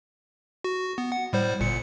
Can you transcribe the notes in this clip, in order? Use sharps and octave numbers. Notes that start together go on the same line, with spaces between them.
F#4
B3
F#5
A2 G3 C5
G1 A#2 C#7